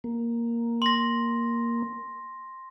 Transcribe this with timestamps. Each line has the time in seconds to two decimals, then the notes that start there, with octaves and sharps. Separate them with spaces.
0.04 A#3
0.82 C6 A#6